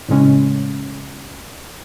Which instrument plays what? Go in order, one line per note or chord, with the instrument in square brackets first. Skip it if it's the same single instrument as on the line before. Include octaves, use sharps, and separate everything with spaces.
[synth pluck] A2 C#3 G#3 C#4